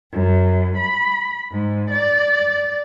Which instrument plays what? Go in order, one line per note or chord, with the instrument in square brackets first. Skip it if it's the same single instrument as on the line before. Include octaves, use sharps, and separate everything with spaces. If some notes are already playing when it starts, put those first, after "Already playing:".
[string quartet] F#2
B5
G#2
D5